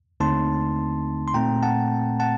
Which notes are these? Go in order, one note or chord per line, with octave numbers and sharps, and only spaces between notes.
D#2 D3 A3 C4 D#4 A5 C6
C6
A#2 A3 C4 G5 A#5
F#5 A5
F#5 A5